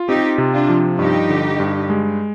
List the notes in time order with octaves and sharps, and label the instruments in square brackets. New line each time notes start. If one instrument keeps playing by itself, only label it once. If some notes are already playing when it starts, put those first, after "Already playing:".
Already playing: [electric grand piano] F4
[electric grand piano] C4 [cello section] D#4 G4
[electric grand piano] C3
[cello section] D4 F4
[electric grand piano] F3
[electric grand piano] G2 [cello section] D#4 G4
[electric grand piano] D3
G2
G#3